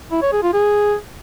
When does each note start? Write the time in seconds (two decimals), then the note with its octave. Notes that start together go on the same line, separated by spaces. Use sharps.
0.12 E4
0.22 C#5
0.32 G#4
0.43 F4
0.53 G#4